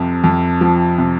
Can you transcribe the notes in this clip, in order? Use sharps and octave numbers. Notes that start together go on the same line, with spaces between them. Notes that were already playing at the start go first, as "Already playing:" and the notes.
Already playing: F2 C3
F2
F3
C3